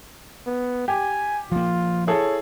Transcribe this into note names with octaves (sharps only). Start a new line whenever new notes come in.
B3
G4 G#5
F3 A#3 F4
E4 G#4 A4 C#5